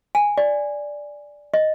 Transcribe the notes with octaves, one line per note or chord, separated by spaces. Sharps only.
G#5
D5
D#5